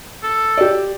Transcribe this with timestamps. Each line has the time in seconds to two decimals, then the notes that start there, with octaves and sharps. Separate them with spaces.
0.23 A4
0.57 G4 D5